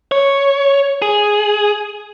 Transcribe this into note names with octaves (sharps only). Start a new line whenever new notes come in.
C#5
G#4